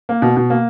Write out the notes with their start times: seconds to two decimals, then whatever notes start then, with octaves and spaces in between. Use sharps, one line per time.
0.09 A#3
0.22 B2
0.37 B2
0.50 A#3